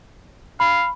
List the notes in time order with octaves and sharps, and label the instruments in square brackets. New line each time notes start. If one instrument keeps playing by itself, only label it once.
[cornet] F5 [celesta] B5